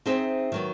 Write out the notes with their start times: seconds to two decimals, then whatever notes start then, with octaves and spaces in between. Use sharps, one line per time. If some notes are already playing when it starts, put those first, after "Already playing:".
0.06 C4 D#4 G#4 C5 E5
0.52 D#3 F#3 B3